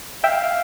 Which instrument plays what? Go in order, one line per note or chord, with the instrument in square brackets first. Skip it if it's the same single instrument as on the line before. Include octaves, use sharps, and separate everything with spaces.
[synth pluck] E5 G5 [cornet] F5